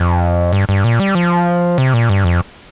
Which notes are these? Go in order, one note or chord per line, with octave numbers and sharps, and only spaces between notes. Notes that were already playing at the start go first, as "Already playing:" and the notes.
Already playing: F2
G2
G2
A#2
G3
F3
C3
A#2
G2
F2